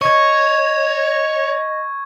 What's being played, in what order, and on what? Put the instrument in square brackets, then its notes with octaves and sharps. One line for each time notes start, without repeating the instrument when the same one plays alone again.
[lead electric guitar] C#5 [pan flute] D#5 [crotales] C#6 G#6